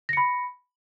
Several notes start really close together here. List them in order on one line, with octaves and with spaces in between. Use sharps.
A#6 C#7 B5